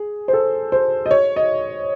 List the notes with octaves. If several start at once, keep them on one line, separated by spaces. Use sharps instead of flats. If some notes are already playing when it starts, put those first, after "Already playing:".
Already playing: G#4
C5
A4
C5
D#5
C#5
D#5